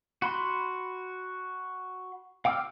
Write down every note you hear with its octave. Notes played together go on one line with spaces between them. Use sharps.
F#4 B5 C6
F5 G5 D6 E6 F6